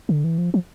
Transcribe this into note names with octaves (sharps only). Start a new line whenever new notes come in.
D3
E3
F3
F3